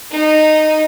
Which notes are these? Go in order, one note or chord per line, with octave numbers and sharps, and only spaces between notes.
D#4